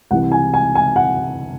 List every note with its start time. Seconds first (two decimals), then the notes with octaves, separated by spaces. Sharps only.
0.11 C2 C3 E3 F#5
0.32 G#5
0.54 G#5
0.75 G#5
0.96 F#5